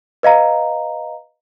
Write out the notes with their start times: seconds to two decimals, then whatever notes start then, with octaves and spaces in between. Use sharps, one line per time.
0.23 B4 D#5 F5 A#5